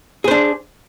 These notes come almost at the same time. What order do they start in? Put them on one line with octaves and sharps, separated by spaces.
G#4 C5 D4